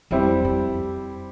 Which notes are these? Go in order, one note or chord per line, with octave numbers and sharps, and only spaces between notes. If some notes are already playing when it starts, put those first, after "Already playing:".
F2 G3 C4 E4 G4
F2